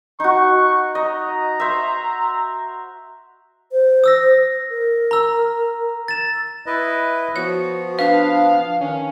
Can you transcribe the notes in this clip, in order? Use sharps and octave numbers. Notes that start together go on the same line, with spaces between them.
D#4 F#4 C#6
D#5 A#5
C5 E5
C5
D#6 E6 A#6
A#4
A#5 E6
A6 E7
E4 B4 D#5
F3 B3 F#4 C#5
D4 B4 F5
D#3 C#4